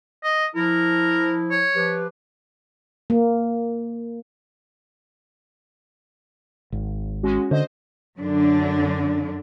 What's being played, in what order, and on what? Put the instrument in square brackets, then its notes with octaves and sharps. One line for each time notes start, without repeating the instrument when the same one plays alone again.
[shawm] D#5
[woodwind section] F3 E4 [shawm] A#4
[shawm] C#5
[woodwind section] F3 G4 B4
[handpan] A#3
[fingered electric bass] G#1
[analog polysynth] G#3 C#4 F#4
[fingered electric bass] D3 [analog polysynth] C5 D#5
[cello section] F#2 D3 D4